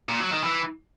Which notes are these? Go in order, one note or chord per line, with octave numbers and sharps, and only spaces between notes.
A#2
F#3
D#3
E3